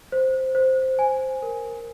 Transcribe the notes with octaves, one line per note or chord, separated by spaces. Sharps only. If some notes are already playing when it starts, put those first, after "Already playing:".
C5
C5
G#5
A#4